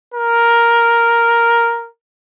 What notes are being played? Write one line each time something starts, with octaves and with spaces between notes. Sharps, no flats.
A#4